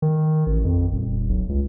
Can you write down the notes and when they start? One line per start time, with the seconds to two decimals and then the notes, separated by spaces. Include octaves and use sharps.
0.02 D#3
0.46 A1
0.65 F2
0.91 D#1
1.29 B1
1.49 C#2